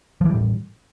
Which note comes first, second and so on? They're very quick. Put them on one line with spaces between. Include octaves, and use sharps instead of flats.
F3 E3 G3 A2